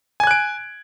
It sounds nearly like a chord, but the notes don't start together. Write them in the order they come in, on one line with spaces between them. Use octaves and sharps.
G#5 G#6 F#6 D7